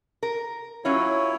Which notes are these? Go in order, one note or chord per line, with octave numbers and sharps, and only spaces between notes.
A#4
F#3 C#4 E4 F4 C#5